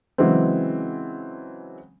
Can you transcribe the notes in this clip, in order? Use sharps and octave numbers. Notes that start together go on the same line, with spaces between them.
C#3 E3 F#3 G#3 C4